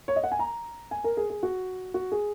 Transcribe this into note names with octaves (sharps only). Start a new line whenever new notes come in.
C#5
D#5
F#5
G#5
A#5
G#5
A#4
G#4
G#4
F#4
F#4
G#4